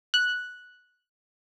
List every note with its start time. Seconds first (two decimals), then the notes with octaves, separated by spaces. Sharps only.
0.14 F#6